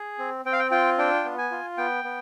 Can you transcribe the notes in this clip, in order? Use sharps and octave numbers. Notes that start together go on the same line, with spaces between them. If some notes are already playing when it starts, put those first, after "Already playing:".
Already playing: G#4
C4
C4 G5
F5
G5
F4 G5
D4 G5
B3
G#5
F4
B3 G5
B3